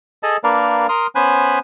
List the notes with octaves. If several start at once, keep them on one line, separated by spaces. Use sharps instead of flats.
G#4 A4 D#5 A5
A#3 D4 A#4 B4 D5 F5
A#4 C6 D#6 F6
B3 C#4 C5 G#5 B5 F#6